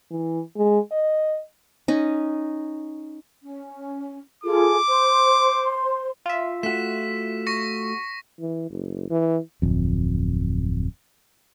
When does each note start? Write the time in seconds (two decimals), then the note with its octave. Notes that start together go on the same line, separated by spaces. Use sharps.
0.11 E3
0.56 G#3
0.92 D#5
1.88 C#4 D#4
3.43 C#4
4.44 F4 G#4 A4 D6
4.88 C5 C6
6.26 F4 E5
6.63 A3 F#4 B6 E7
7.47 C#6 A#6 C#7
8.40 E3
8.71 F#1
9.10 E3
9.62 D1 F2